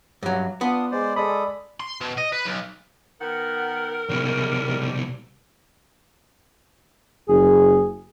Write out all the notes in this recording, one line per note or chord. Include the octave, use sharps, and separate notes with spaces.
G2 F#3
B3 D4 F4 D#6
G#3 C5 D5
G#3 A4 D5 B5 D#6
C6
B2
D#5
B4
B1
D#3 B3 A#4 F#5
C2 G#2 B2 G3
F#1 G#4